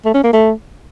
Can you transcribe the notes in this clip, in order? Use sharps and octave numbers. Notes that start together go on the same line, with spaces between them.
A3
C#4
A#3
A3